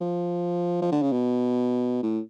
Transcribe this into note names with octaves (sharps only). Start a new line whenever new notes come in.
F3
F3
D3
C#3
B2
A2